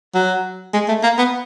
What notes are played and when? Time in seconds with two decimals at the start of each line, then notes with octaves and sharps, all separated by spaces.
0.14 F#3
0.74 G#3
0.88 A3
1.03 A#3
1.18 B3